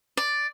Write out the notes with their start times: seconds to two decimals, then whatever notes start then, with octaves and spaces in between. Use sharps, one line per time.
0.17 D5